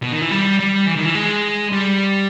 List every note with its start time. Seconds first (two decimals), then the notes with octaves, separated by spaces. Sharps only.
0.03 B2
0.12 D#3
0.21 E3
0.31 G3
0.60 G3
0.87 E3
0.96 D#3
1.05 E3
1.15 G#3
1.72 G3